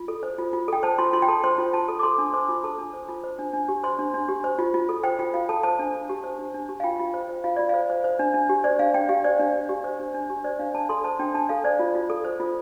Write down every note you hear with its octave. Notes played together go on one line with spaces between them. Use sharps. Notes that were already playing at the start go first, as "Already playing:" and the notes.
Already playing: F4
A4
C5
F4
F4
A4 G5
C5 A5
F4 C6
F4 C6
G5
A4 A5
C5 C6
F4
F4 A5
A4
D6
A4 C6
D4
C5 D6
F4
A4 A5
D4
C5
F4
C5
D4
D4
G4
C5 C6
D4
D4
G4
C5
F4
F4
A4
C5 G5
F4 G5
F4 F5
A4 A5
C5 A5
D4
D4
G4
C5
D4
D4
G4
F5
F4 G5
F4
C5
C5
F4 F5
F4 D5
C5 F5
C5
C5
D4
D4
G4
C5 D5
D4 F5
D4 G5
G4 F5
C5 D5
D4
D4
G4
C5
D4
D4
G4
C5 D5
D4 F5
D4 A5
A4 C6
C5 A5
D4 G5
D4 A5
A4 F5
C5 D5
F4
F4
A4
C5
F4